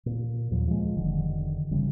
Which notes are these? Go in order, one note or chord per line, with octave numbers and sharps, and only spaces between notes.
A#2
D#2 A#2 F3 F#3
F3 F#3 G#3
F1 D3 D#3
G1 C#3 E3 G3